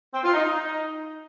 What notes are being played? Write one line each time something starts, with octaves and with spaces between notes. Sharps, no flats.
C4
F4
D#4
D#4